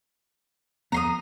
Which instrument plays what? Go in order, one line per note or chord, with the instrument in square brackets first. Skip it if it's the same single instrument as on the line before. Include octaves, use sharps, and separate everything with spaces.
[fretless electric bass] E2 F3 B3 [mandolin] A#5 C6 D#6